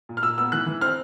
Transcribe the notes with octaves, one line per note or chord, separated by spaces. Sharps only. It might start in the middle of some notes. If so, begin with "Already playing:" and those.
A#2
F6
A#2 E6
B3 E6
E3 F#6
E3
C4 F6